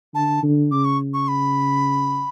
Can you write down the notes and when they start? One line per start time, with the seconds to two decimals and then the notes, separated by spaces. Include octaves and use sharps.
0.14 D3 A5
0.43 D3
0.71 C#3 D6
0.85 C#6
1.14 C#6
1.28 B5